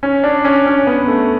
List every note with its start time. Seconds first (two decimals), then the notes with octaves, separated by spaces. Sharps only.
0.03 C#4
0.24 D4
0.45 C#4
0.66 C#4
0.87 B3
1.08 A3